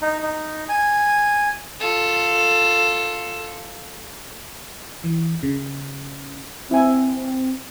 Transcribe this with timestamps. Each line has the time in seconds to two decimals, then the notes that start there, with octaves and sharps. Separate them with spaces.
0.02 D#4
0.23 D#4
0.69 G#5
1.80 F4 A4
5.04 E3
5.43 C#3
6.71 C4 E4 G#5